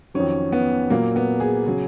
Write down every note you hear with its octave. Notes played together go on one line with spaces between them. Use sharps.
F2 D#3 F#3 C#4
B3
A#2 F#3 A#3
B3
G#4
C#3 F#3